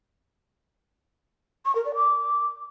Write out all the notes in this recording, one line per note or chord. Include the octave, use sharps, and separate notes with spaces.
C#6
A#4
D5
D6